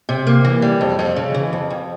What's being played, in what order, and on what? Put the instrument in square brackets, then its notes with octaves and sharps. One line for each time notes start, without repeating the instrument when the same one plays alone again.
[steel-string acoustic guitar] C3
A#3
E3
G3
F2
F2
C#3
E3
F2
F2